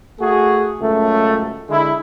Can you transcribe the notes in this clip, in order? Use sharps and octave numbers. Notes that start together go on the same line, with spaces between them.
A3 F#4 G#4
C#2 F#2 A3
D3 G#3 E4